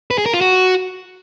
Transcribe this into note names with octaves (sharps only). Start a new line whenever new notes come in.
B4
G#4
A#4
F4
F#4